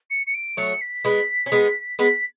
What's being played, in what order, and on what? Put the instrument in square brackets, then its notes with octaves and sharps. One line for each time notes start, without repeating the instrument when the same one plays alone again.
[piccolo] C#7
C#7
D7
[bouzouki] F#3 A3 [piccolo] C#7
[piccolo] B6
[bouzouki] G#3 B3
C#4
G#3 B3
[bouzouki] G#3 B3 [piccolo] B6